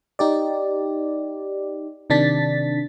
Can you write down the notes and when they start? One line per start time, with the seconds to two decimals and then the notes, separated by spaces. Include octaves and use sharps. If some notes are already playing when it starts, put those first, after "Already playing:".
0.19 D#4 G4 D5
2.10 C3 D#3 D4 A6 B6